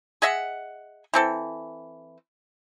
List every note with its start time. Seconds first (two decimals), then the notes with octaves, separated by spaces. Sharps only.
0.22 G#4 D#5 E5 F#5
1.14 E3 C4 A4